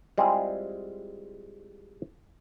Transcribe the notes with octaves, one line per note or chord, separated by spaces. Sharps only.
G3 G#3 C4 E4 F4 G#4